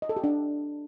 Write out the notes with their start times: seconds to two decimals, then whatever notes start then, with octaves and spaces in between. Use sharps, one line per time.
0.02 D#5
0.09 A4
0.17 G4
0.24 D4